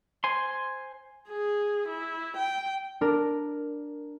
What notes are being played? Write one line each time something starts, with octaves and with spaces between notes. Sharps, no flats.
C5 G#5 C6
G#4
E4
G5
D4 A#4